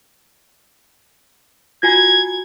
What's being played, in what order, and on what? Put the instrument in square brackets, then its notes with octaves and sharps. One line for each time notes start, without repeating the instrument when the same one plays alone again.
[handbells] F4 F#4 G#5 [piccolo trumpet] G#6